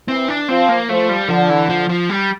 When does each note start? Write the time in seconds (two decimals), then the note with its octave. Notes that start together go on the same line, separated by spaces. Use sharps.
0.08 E3 C4
0.28 D4
0.49 F3 C4
0.69 A#3
0.89 F3 A3
1.09 G3
1.29 D3 F3
1.50 E3
1.69 F3
1.89 F3
2.10 G3